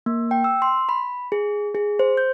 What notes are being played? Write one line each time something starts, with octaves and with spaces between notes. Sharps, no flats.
A#3
G5
E6
C6
B5
G#4
G#4
C5
G6